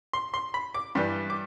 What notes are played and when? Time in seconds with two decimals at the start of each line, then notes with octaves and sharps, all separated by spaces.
0.13 C6
0.34 C6
0.54 B5
0.74 D6
0.95 G2 E3 G3
1.30 D6